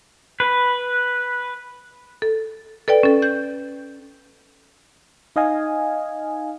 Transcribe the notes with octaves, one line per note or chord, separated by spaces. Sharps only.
B4
A4
A4 B4 D5 G5
C#4 A4
G6
D#4 D#5 F5 G#5